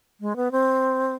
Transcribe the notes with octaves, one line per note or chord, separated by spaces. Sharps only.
G#3
B3
C4